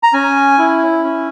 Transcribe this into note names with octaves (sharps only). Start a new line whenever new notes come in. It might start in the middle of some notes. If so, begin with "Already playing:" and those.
A#5
C#4 G#5
E4
C#4